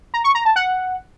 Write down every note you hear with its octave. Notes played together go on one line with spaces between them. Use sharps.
A#5
C#6
A#5
A5
F#5